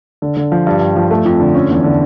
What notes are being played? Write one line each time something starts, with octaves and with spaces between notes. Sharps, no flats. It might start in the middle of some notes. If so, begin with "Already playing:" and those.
D3
D3
F3
G2
G2
F3
A3
F2
D3
C#4
E2
D3